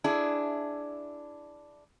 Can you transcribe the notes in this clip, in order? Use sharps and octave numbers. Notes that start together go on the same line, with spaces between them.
D4 E4 G#4